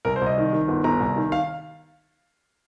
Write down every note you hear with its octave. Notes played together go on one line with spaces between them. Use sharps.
C2 A#4
C5
C2 D#5
D#3
D#3
G1
G1 A#5
C2
D#3
F5